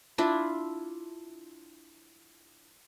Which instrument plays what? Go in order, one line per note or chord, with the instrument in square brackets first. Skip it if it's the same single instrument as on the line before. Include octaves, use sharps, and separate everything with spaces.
[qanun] D4 E4 F4